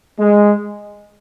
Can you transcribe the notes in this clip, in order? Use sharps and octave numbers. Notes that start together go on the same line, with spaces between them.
G#3